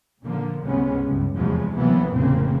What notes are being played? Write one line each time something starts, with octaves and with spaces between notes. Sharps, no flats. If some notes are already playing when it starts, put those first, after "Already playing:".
A#2 D3 F3 A#3
C#2 G#2 C3 G#3 B3 C#4
C#2 G2
F1 E2 C3 F3 F#3 G#3
D2 C3 E3 F#3 A#3 B3
F1 E2 A2 C#3 A#3 C4